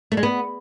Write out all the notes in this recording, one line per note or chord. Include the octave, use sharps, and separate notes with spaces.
A3
G#3
B3